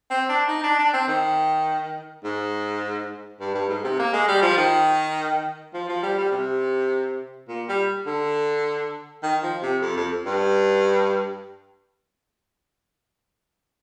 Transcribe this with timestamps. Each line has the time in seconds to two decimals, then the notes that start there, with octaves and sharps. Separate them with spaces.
0.10 C4
0.29 D4
0.48 D#4
0.63 D4
0.78 D4
0.93 C4
1.08 D#3
2.24 G#2
3.40 G2
3.54 G2
3.69 G#2
3.84 C3
3.99 A#3
4.13 G#3
4.28 G3
4.42 F3
4.57 D#3
5.74 F3
5.89 F3
6.03 G3
6.18 G3
6.32 C3
7.48 A#2
7.69 G3
8.06 D3
9.23 D#3
9.43 F3
9.62 C3
9.82 F2
9.96 F2
10.26 G2